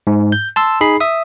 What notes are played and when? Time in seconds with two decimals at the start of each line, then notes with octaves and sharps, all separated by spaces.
0.07 G#2
0.32 G6
0.56 A5 C6 E6
0.81 D#4 G#4 B5 C7
1.00 E5 D#6